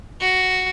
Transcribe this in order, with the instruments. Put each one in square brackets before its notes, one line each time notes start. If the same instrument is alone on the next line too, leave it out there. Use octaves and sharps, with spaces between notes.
[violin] F#4